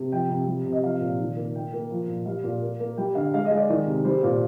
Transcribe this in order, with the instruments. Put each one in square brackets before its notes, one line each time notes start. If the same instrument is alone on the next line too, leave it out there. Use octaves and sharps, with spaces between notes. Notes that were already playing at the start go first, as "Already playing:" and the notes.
Already playing: [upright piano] C3
F3 G5
C3
G3
C3
D#5
F3 F5
A#2
D#3
A#3
A#3 G5
A#3
F3
A#2
G3 F5
A#2
A#3
A#3
G3 G5
D3 F5
G#3 F5
D#5
G#3
D5
D#3
C3
G3 C5
A#2